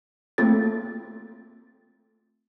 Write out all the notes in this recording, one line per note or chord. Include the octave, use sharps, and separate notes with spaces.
A3 A#3 C4 F4 A4 A6